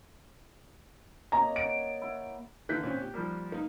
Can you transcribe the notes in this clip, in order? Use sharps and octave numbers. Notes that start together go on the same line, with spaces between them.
A#3 C#5 D#5 A#5
F#5 D7
E4 F#5
D3 E3 A#3 F#6 G6 B6
A#2 C4 C#4
G4
F3 G3 A#3
A#3 D#4